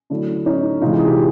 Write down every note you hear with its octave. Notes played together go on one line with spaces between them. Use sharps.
D3 F#3 A3 D4 E4
C#4 D#4
C3 E3 G#3 D#4 F4
G#4
G4